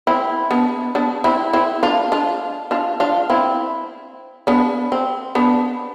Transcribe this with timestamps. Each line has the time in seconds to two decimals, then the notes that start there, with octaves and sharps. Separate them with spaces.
0.07 C4 E4
0.51 B3 D4
0.95 B3 D4
1.24 C4 E4
1.53 C4 E4
1.83 D4 F4
2.12 D4 F4
2.71 D4 F4
3.00 D4 F4
3.30 C4 E4
4.47 B3 D4
4.92 C4
5.35 B3 D4